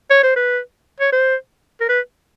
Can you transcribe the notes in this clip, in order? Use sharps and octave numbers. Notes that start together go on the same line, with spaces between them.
C#5
C5
B4
C#5
C5
A#4
B4